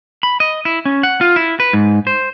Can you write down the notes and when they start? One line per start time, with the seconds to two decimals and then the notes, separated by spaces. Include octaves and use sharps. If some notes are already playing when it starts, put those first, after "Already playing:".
0.23 B5
0.40 D#5
0.65 E4
0.85 C#4
1.03 F#5
1.21 F4
1.36 E4
1.60 B4
1.73 G#2
2.07 C5